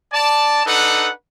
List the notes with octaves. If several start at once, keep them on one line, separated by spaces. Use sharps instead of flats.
D5 A5
D4 D#4 A4 B4 F#5